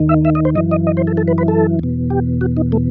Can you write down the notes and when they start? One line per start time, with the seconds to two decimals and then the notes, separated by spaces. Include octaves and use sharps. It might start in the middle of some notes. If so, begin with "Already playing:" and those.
Already playing: D#2 D#3
0.09 E5
0.25 E5
0.35 D#5
0.45 C5
0.55 F#2 E3 D#5
0.71 D#5
0.87 D#5
0.97 C5
1.07 A4
1.17 A4
1.28 B4
1.38 B4
1.48 A4
1.79 E2 B2
2.10 G4
2.41 F#4
2.57 D#4
2.72 A3